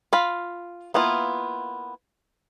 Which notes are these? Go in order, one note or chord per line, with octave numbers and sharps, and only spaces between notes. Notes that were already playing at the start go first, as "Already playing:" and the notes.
F4 F5 B5
A#3 B3 E4 F4